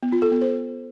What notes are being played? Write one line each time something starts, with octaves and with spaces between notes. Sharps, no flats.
B3
F4
A4
B3
C5